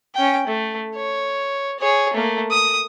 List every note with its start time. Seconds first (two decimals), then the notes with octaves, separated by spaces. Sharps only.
0.15 C#4 G5
0.47 A3
0.95 C#5
1.79 G#4 C#5
2.14 A3 A#3
2.51 D#6